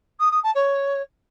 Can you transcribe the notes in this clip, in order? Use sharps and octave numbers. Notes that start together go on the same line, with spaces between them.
D#6
D#6
A5
C#5